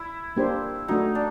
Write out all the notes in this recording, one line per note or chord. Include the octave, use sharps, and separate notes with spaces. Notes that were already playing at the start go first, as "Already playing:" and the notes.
Already playing: E4
A#3 D4 G4 C5
A3 D4 D#4 F#4
D4